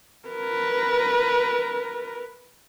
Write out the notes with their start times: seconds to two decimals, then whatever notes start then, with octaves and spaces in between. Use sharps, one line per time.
0.28 A#4 B4